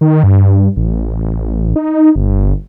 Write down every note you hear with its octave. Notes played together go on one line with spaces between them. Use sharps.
D#3
G2
A1
D#4
G1